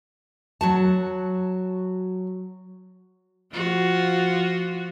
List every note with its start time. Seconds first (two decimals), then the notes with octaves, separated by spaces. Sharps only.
0.61 F#3 F#4 A5
3.52 F3 F4 F#4